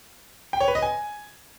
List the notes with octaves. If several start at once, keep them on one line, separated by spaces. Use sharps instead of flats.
G5
C#5
B4
D#5
G#5